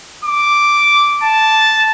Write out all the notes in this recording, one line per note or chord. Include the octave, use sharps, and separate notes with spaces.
D6
A5